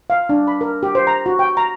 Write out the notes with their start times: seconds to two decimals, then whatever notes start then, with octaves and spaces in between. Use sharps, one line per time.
0.10 F5
0.29 D4
0.47 B5
0.61 A#4
0.83 G4
0.95 C5
1.07 A#5
1.26 F#4
1.39 G5
1.57 A#5